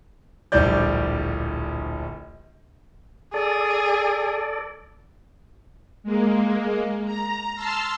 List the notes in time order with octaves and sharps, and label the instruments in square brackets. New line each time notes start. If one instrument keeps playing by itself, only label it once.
[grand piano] D1 A#1 G3 D5 G6
[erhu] G#4 [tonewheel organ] A4 D5
[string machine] G#3 A#3
A#5
A5 C6 E6 F6